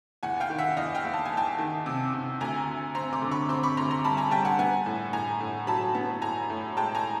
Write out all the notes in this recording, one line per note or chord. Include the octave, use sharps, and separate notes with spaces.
E2 F#5 G#5
F5 G5
D#3
E5 F#5
E2 D#5 F5
F5 G5
E2
A5
G#5
E2 G5 A5
D#3
C3
C3
D2 G#5 A#5
D2
C4 A#5 C6
C6 D6
D3
B5 C#6
C4 C6 D6
B5 C#6
D2 A#5 C6
A#5 C6
G3 A5 B5
G#5 A#5
G3 G5 A5
F#5 G#5
B3 F#5 G#5
A2
A2 G#5 A#5
A2
F#3 A5 B5
B3
A2 G#5 A#5
A2
G#3 G5 A5
G#5 A#5